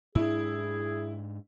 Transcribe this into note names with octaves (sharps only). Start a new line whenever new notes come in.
G#2 D4 E4 G#4